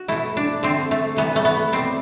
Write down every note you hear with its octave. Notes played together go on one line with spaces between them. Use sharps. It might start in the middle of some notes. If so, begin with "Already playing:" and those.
Already playing: F#4
B2 A3 E4
D4
D3 A3 C4
A3
C3 E3 G3 B3
A3
B3
B2 G3 C4